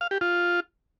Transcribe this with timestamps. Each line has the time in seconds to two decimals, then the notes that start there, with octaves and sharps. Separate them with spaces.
0.01 F5
0.11 G4
0.21 F4